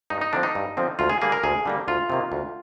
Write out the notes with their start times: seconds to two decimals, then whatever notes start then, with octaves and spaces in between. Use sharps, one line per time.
0.10 G2 D#4
0.21 D#4
0.33 D3 F3 C4 D4
0.43 D#4
0.55 G2
0.77 D3 F3 C4
0.99 D2 F4
1.10 G#4
1.21 D3 G3 A#3 G#4
1.32 A#4
1.44 D2 G#4
1.66 D3 G3 A#3
1.88 D2 F4
2.10 C3 D#3 A#3
2.32 D2